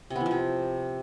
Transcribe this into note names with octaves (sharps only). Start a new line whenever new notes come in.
C3
B3
E3
F3
C3